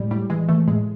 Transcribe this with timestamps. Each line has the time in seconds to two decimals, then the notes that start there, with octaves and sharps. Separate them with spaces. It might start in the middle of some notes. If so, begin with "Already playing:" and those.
Already playing: A2 G3 G#3
0.11 A2 G3
0.30 E3 G#3
0.48 E3 A3
0.68 A2 G#3